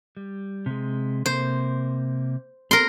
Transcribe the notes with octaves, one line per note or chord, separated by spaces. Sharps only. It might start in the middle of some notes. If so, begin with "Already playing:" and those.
G3
C3 G#3
C3 A#3 C5
B3 C4 A#4 C6